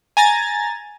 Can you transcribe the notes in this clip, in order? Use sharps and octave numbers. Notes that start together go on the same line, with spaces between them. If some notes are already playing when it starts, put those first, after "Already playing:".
G#5 A#5 A6